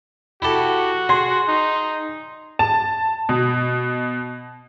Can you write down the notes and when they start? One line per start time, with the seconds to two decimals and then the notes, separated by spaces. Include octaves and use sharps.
0.42 E4 F#4 G4 A4
1.09 G#4 C6
1.48 D#4
2.59 A5
3.29 B2